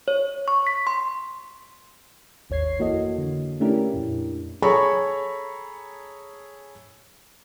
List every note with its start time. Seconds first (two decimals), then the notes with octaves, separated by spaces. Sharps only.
0.08 C#5
0.48 C#6
0.67 B6
0.87 C6
2.50 G#1 D#2 C#5 G#6 C7
2.79 F2 E3 A#3 F#4 A4 D#5
3.18 D3
3.60 A3 C#4 D4 E4 G4 A#4
3.94 F2 A#2
4.62 G#4 A4 C#5 A#5 B5 C#6